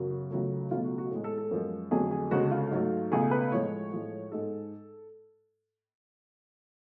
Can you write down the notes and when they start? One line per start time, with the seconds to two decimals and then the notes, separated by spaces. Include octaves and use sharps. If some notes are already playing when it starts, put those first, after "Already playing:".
Already playing: F#2 C#3 F#3
0.11 F#4
0.31 C#2 C#3 F#3 A3
0.71 C#2 B2 F#3 A3 F4
0.84 F#4
0.98 F#4
1.11 A2 G#3
1.24 A4
1.38 A4
1.51 F#2 F3 G#3
1.91 F2 D3 F#3 A3 G#4
2.11 G#4
2.31 D2 C#3 G#3 F#4
2.51 F4
2.71 G#2 F#3 A3
3.11 C#2 B2 A3 G#4
3.31 B4
3.52 A2 F3 G#3 C#5
3.92 A2 F3 G#3
4.32 G#2 G#3 A4